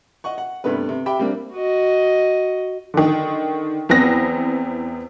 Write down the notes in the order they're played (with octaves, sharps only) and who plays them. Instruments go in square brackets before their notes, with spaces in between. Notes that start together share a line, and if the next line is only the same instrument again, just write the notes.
[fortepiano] D#5 F#5 C#6
F#5
G2 C3 A3 B3 B4
C3
G4 E5 G5 B5
G3 A#3 C4 D4
[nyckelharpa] F#4 D#5
[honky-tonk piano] D3 D#3
E2 B3 C4 A#6